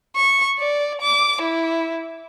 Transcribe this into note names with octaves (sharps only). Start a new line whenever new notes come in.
C#6
D5
D6
E4